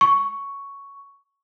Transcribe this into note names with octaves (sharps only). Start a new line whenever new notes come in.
C#6